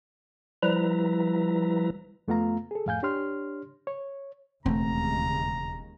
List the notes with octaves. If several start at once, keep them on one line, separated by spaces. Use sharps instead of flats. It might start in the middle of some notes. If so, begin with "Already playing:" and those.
F3 G3 E4 B4 A#5
F2 A3 B3 F4 F5 A#5
G#4 A4
F2 A2 F5 G#5 G6
D4 G4 C#5 C6 F6
C#5
E1 D#2 C#3 G#3 A3 B3 C4 A#5